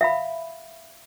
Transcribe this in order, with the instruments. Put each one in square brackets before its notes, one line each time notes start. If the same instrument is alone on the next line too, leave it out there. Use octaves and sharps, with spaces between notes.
[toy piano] E5 F5 B5